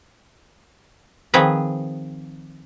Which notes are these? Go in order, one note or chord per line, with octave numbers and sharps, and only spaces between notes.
D#3 F3 C4 G#4 B4